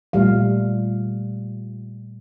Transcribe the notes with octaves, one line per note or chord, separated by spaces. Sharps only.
A#2 G3 A3 F5